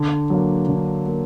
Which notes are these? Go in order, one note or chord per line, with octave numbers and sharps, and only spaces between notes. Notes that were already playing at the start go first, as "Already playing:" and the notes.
Already playing: D3
F#3 A#3
D3
A#3